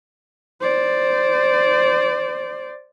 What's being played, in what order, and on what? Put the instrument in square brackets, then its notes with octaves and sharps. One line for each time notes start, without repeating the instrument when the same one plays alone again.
[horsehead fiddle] C5 D5